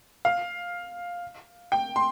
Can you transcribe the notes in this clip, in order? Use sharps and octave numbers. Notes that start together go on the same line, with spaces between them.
F5
G5
C6